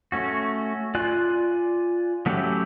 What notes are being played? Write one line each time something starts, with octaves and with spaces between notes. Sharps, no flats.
A3 C#4 F#4
F4 D5 G#5 F#6
F#3 A3 C#4 E4 G4